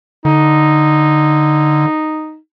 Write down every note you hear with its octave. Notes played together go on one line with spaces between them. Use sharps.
D3 D#4